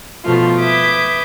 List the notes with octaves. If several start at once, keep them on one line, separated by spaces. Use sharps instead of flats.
B2 F3 A3 F4
B4 E5 D6 D#6 G6 G#6